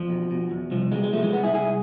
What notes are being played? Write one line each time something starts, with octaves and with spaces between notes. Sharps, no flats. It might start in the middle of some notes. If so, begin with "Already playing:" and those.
Already playing: E2 F3
B2
B2
E2
C2 F3
B2 E3 G#3
G#3
B2 F3 A3
E3 G#3
C2 G#3 B3
E4 G#4
C2 E4 G#4